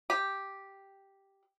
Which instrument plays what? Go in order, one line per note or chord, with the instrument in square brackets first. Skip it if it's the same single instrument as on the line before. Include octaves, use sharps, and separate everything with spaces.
[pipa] G4